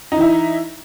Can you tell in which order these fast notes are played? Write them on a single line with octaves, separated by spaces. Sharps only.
D#4 E3 E4